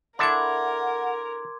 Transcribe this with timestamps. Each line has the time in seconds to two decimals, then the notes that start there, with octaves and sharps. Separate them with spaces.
0.19 D4 E4 A4 A#4 F#5 C6 D6 G#6